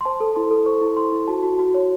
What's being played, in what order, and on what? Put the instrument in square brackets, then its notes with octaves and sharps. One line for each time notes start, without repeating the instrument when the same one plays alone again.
[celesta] C6
C5 A5
A4
E4 C6
A4
C5 C#6
E4
E4 C6
E4
F#4 A5
F#4
F#4
C#5